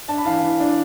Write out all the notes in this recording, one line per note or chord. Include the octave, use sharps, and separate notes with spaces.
D4 A5
B5
E3 F5 A5
E3
D4